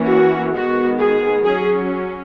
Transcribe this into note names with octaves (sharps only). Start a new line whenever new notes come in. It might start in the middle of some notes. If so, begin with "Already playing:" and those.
Already playing: E3 A#3 C#4
F#4
D#3 G#3 B3 F#4
G#4
F#3 C#4 G#4